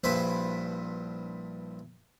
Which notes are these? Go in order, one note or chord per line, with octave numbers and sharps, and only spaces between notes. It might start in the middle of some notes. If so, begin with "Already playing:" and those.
A#1 G2 E4 B4 C5